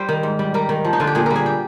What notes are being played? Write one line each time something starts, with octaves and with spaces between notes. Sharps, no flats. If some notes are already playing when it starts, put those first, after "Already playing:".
Already playing: G3 C5
D#3
G#2
G3
G3 A#4
D#3
F3
D#4
D3 F4
G4
A#2 G#4
G3 A#4
G#4
G4